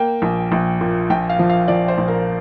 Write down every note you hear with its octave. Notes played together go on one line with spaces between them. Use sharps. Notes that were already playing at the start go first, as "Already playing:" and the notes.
Already playing: A#3 G5
A#1
A#1
A#2
A#1 G5
F5
F3
F5
F3 D5
C5
A#1
A#4